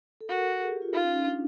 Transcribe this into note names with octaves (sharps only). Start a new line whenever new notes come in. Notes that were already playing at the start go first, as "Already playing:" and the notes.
A4
F#4 A#4
G#4
G4
F4
D#4 F4
C#4
C#4
D4